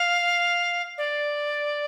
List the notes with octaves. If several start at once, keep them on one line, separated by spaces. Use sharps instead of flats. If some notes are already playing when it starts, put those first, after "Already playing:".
Already playing: F5
D5